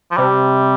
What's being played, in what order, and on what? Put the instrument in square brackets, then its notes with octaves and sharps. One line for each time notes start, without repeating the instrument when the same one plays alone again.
[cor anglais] F3
[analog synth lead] C3 [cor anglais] G3